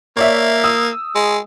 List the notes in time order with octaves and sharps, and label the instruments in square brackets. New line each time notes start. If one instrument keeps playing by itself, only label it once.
[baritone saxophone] A#3 [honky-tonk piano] C#5 D5 E5
[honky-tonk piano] D#6 E6
[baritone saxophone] G#3